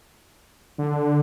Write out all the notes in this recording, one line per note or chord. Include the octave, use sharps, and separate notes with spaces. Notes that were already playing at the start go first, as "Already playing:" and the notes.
D3